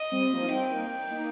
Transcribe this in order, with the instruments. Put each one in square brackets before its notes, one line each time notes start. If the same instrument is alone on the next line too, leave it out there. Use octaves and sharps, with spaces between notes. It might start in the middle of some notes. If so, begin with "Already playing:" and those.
Already playing: [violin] D#5
[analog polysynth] G3 C4
F3 A#3
D#4
[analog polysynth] G3 C4 [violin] G5
[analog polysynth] A#3 D#4
A#3 D#4